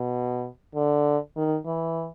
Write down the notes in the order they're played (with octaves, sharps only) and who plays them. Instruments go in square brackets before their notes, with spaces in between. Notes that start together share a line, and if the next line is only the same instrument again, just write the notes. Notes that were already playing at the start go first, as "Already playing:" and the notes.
Already playing: [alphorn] B2
D3
D#3
E3